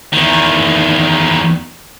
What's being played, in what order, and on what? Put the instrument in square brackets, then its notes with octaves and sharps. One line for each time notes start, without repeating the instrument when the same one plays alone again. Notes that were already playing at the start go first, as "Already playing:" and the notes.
[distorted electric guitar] E2 D#3